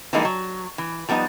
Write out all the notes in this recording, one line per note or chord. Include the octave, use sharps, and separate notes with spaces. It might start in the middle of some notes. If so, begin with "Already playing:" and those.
E3 F3 G3 G#3 A#3 D#4
F#3
E3
F3 G3 B3 D#4 D#5